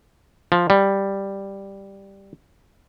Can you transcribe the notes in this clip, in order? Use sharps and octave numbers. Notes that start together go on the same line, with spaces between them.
F3
G3